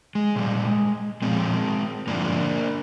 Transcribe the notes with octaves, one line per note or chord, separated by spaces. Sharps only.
G#3
A#2 G3
A#2 F3 G#3 C4
G2 D3 F3 A#3 D4